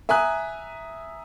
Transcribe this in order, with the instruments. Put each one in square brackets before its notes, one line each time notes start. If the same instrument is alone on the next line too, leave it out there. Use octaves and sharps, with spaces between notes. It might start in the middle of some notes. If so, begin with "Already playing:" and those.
[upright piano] E5 G#5 A#5 D#6 F#6